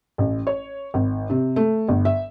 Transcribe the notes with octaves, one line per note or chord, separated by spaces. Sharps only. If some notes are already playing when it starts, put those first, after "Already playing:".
A1
C#5
G#1
C3
A3
G1
E5